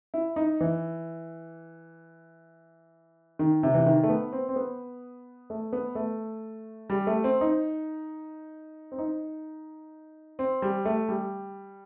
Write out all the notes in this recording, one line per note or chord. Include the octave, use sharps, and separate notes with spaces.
E4
D#4
E3
D#3
C3
E3
D#3
A3
B3
C4
C4
B3
A3
B3
A3
G3
A3
C4
D#4
C4
D#4
C4
G3
A3
G3